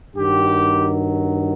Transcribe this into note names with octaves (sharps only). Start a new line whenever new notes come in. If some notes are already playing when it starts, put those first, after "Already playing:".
G2 D#3 F#3 G4